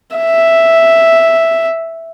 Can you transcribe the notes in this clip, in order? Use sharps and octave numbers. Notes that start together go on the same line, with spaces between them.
E5